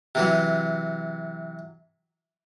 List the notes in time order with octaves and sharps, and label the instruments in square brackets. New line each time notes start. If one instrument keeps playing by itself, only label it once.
[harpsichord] C3 E3 F#3